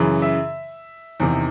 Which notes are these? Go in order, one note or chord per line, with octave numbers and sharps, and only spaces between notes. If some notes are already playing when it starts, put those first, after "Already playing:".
Already playing: F#2 C#3 E3
E5
E2 C3 D#3